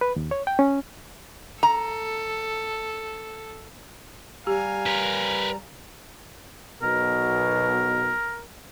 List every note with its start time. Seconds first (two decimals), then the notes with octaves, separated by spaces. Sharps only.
0.01 B4
0.16 D#2
0.31 C#5
0.47 G5
0.59 C#4
1.63 A4 A#5
4.47 G3 G4 F5 G#5 A#5
4.86 A#4 B4
6.82 B1 B2 A#4